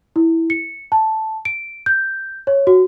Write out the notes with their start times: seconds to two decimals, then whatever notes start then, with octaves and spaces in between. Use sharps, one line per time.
0.16 E4
0.50 C#7
0.92 A5
1.45 D7
1.86 G6
2.47 C#5
2.67 F#4